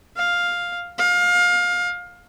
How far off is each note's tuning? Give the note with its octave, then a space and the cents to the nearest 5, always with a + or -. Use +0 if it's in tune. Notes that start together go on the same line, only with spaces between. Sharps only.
F5 +5
F5 +25